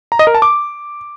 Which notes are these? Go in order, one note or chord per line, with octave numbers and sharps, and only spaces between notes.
A#5
D#5
A#4
A5
D6